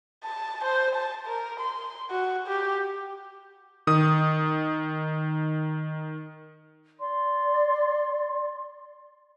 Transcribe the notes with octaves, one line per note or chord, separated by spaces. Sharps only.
A5
C5
A5
A#4
C6
F#4
G4
D#3 D#6
D5 C6